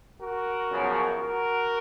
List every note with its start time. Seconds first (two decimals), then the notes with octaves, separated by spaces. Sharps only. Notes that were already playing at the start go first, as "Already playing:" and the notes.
0.20 F#4 A#4
0.70 F#2 C#3 F3 B3
1.21 F#4 A#4